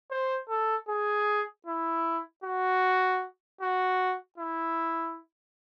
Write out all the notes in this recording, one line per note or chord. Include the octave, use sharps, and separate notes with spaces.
C5
A4
G#4
E4
F#4
F#4
E4